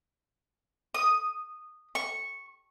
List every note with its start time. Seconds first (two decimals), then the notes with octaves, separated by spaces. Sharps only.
0.94 D#6
1.95 C#6